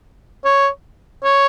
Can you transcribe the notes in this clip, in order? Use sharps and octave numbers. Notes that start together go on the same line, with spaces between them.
C#5
C#5